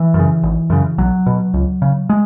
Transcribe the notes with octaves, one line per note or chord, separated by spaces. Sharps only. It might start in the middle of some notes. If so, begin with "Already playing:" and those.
Already playing: E3
F#2
C#3
G#1
F#2 C#3
B1 F#3
B2
C#2
C#3
G#3